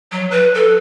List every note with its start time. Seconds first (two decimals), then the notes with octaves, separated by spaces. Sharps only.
0.12 F#3
0.31 B4
0.54 A4